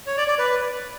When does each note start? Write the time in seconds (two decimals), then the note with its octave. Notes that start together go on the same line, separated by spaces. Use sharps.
0.07 C#5
0.17 D5
0.28 D5
0.39 B4